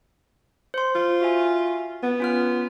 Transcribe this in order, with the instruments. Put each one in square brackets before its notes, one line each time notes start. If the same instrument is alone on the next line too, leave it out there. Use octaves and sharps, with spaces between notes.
[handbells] C5 C6
[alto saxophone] F4
[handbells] F#4 E5 G#5
[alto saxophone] B3
[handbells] C#4 F4 F6